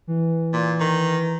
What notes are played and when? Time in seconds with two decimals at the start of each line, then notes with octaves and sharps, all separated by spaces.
0.07 E3
0.53 A#2
0.80 D#3